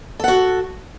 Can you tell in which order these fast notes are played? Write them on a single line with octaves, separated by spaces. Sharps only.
A4 F#5 F#4